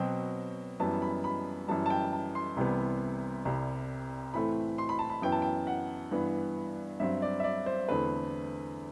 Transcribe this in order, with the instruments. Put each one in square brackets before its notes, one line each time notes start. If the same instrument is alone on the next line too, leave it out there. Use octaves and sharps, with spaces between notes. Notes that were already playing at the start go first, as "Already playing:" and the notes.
Already playing: [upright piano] B2 F#3 C4 G5
F#2 E3 G3 B3 A5
B5
B5
F#2 E3 G3 A5
A5
G5
A5
C6
C2 C3 E3 G3 B3
C2 C3 G3
A2 E3 A3 C4 B5
C6
B5
A5
B5
F#2 E3 B3 G5
A5
G5
F#5
G2 E3 B3
G2 F#3 C4 E5
D5
E5
D5
C5
E2 D3 A3 C4 B4